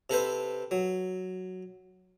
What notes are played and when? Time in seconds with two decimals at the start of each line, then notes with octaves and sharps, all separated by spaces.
0.10 C3 A4 B4 C5
0.71 F#3